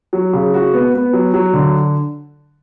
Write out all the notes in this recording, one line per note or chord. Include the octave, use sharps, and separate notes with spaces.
F#3
C#3
F#4
B3
B3
F#3
F#3
D3